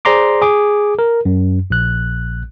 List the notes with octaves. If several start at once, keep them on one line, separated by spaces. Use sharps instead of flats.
G#4 C5 D5 A#5 C6 D6
G#4 D6
A#4
F#2
A#1 F#6